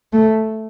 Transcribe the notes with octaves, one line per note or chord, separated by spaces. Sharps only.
A3